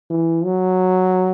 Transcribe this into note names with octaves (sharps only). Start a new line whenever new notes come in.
E3
F#3